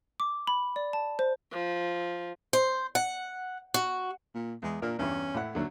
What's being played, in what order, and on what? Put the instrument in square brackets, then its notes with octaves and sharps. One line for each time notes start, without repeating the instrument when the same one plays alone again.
[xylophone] D6
B5
D5
A5
C5
[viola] F3
[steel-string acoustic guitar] C5
F#5
F#4
[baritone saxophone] A#2
[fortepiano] E2 [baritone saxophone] G#3
[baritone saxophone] A#2 [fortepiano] D4 A#4 F6
[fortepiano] E2 G2 E3 [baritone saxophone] C#4
[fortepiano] A2 E4 F#5
[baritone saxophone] D#2 [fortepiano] D3 F#3 A3